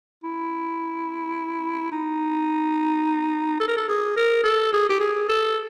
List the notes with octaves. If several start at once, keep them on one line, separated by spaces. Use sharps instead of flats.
E4
D#4
A4
A#4
A4
G#4
A#4
A4
G#4
G4
G#4
A4